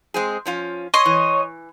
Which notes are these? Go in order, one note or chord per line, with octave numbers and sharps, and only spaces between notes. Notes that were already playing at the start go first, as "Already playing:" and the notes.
G#3 C4 G#4
F3 C#4 F4
C#5 D#5 C6
E3